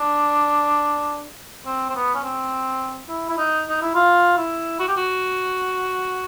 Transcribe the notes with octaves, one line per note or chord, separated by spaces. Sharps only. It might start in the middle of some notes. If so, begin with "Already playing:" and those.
Already playing: D4
C4
C4
B3
C#4
C4
E4
E4
D#4
D#4
E4
F4
E4
F#4
G4
F#4